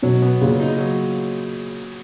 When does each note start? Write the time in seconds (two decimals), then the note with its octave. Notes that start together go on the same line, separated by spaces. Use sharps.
0.02 B2 F#3
0.22 B3
0.41 A#2 C#3
0.60 D#4
0.78 F#3